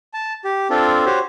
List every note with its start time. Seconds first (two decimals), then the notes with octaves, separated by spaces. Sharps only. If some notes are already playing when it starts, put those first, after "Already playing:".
0.14 A5
0.45 G4
0.70 C4 D4 F4 A4
1.06 F#4 G4 C5 C#5